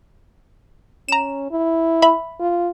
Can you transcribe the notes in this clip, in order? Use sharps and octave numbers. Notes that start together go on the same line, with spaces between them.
C#4 A#5 E7
E4
E5 B5
F4